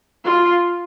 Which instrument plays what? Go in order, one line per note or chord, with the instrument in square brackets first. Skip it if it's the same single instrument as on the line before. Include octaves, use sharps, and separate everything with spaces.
[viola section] F4